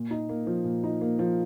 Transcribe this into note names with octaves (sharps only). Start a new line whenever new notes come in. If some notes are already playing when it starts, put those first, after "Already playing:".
Already playing: A#2
D#4
A#3
F3
A#2
D#4
A#3
F3